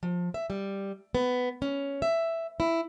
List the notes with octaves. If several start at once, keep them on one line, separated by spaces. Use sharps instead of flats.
F3
E5
G3
B3
C#4
E5
E4